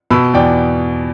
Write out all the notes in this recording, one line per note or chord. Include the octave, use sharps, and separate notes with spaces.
B2 B5 E6
E2 D5 G5